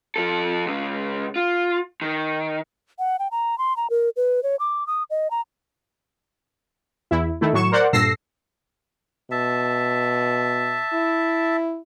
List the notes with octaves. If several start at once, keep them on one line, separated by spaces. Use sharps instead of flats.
F3 A4
C#2 C#3
F4
D#3
F#5
G5
A#5
C6
A#5
A#4
B4
C#5
D6
D#6
D#5
A#5
E2 E4
D#3 A3 E4
A2 F#3 C#6 E7
A#4 C5 D5 F#5
G2 A#2 A4 E6 A#6 C7
B2 E5 A5
E4